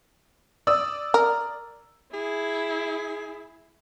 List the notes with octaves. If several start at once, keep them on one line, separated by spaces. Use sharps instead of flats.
D5 D#6 E6
A#4
E4 G#4